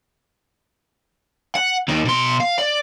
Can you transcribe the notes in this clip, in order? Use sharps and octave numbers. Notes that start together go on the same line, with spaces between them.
F#5
D#2 D#3
B2 C6
F5
D5